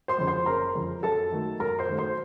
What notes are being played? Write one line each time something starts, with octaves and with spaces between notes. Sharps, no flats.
C5 C6
F2 C#3
C5 C6
F#1 A#4 A#5
F2 C#3
F#2 A4 A5
D#3 F#3 A3
F#2 A#4 A#5
C5 C6
D#3 F#3 A3
C5 C6